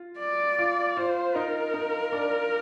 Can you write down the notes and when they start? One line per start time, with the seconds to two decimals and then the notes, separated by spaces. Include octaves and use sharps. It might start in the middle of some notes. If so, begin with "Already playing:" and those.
Already playing: F4
0.19 D5
0.59 F4
0.97 F4 C5
1.35 D#4 A#4
1.74 D#4
2.12 D4